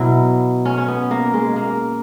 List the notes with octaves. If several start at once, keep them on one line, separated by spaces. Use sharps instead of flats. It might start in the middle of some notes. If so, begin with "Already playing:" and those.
Already playing: B2 F#3 E4
C#4
C#4
B3
A#3
G#3
A#3